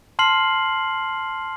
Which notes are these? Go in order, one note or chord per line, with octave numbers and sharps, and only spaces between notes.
A5 C6 F6 C7 F#7